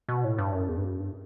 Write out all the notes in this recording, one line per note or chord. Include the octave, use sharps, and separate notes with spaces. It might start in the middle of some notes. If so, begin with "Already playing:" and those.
B2
A2
G2
F#2
E2
G2
F#2
G2